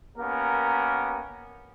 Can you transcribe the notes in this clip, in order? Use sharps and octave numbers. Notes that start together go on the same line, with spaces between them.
A#3 B3 C#4 G4 A#4